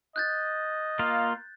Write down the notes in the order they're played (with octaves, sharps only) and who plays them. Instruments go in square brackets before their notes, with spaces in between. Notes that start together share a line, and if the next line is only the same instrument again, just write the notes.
[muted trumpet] D#5 [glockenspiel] F#6 G6 A6
[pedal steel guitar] A#3 F4